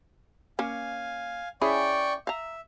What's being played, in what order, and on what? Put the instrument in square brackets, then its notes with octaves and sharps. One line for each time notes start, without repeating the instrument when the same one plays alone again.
[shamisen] A#3 C#4 [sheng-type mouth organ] F5 G#5
[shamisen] C#4 E4 G#4 [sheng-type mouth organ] D5 G5 C#6
[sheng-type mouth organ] E5 [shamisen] F5 A#5